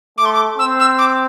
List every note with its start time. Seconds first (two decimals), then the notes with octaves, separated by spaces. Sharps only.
0.18 A3 D6
0.25 C6
0.33 D6
0.58 C4 E6
0.79 E6
0.98 D6